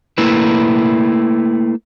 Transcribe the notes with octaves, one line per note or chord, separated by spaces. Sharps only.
A3 A#3 E4 B4